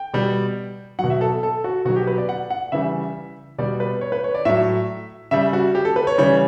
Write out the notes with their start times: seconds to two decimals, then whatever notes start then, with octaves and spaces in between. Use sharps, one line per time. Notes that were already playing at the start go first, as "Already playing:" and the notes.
Already playing: G5
0.13 B2 G3
0.99 B2 F#3 F#5
1.10 E5
1.21 A4
1.43 A4
1.64 F#4
1.85 B2 F#4
1.88 F#3
1.96 G4
2.07 B4
2.18 D5
2.29 F#5
2.50 F#5
2.72 C#3 E3 G3 E5
3.58 B2 G3 D5
3.80 B4
4.01 C#5
4.12 B4
4.24 C#5
4.35 D5
4.45 A2 F#3 E5
5.31 C#3 G3 E5
5.53 F#4
5.75 G4
5.85 A4
5.96 B4
6.07 C#5
6.18 C#3 E3 G3 C#5